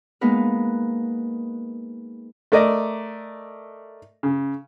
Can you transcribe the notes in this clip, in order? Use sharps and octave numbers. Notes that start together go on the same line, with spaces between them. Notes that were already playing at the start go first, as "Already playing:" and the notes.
G#3 A#3 B3 D#4 B4
A3 A#4 D5 D#5
C#3